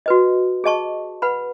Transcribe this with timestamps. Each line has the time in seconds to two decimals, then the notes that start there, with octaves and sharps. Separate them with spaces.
0.06 F#4 B4 D#5
0.64 G#4 D#5 A5 C#6
1.22 B4 F#5 B5